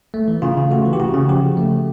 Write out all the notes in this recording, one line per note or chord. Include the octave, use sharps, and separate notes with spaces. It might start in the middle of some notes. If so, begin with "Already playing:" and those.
A3
E3
C#3 F4
C#3
A3 F#4
E3
G4
C#3 F#4
C#3
F3 G4
C#3
A3